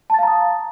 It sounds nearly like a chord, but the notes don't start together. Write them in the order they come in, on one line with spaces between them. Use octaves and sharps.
A5 A6 F5 A#5 D#6